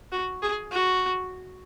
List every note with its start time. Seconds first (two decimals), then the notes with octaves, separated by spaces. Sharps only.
0.12 F#4
0.42 G#4
0.72 F#4